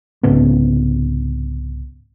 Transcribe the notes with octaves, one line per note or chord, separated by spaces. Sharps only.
C2 G#2 C#3 B3